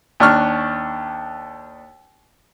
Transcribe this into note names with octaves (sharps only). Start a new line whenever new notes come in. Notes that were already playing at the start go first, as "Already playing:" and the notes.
D#2 D4 C#6 F6